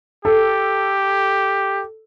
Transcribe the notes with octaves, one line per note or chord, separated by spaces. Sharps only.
G4 A4